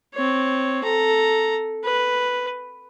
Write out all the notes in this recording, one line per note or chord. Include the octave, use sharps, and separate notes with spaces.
C4 C#5
A4 A#5
B4